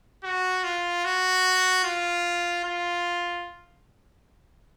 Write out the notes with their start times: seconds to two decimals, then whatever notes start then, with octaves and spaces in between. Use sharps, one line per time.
0.24 F#4
0.64 F4
1.05 F#4
1.84 F4
2.64 F4